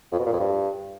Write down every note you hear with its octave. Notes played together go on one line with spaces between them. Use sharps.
F2
B2
A#2
F2
G2